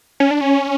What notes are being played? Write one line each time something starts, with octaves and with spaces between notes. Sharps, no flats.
C#4
D4
C#4